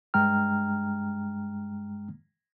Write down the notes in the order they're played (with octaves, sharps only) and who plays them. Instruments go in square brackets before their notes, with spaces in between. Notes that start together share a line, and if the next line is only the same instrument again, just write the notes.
[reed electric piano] G2 G#3 G5 A#5 F6